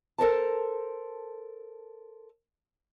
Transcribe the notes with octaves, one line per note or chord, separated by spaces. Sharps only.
A4 A#4 C5 A5